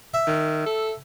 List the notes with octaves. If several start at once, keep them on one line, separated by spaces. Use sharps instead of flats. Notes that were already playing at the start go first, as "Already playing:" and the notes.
E5
D#3
A4